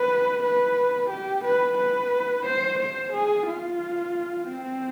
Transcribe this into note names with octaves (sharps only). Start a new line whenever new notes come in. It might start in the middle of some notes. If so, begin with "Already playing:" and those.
Already playing: B4
B4
G4
B4
B4
C5
C5
G#4
F4
C4